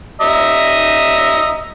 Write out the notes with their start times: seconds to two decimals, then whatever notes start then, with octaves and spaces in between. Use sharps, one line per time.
0.21 D#5 E5 A#5